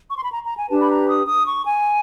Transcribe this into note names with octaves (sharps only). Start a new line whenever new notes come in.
C#6
C6
B5
A#5
A#5
G#5
D4 G4 B4 A5
B5
A#5
D#6
D#6
C#6
G#5